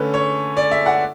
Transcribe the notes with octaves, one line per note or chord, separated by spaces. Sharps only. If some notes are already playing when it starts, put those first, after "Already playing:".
Already playing: D3 A3 C#4 B4
C#5
D5
E5
F#5